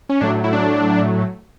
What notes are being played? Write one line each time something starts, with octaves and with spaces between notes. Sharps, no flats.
C#4
A2 F#3 A3 D4
E4
D4